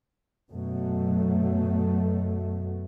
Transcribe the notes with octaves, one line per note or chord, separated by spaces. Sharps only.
F#2 B2 F#3 A3